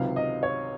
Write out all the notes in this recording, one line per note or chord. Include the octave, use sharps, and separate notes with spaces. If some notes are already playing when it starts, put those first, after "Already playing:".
Already playing: C#2 C3 D#3 F#3 F5
D#5
C#5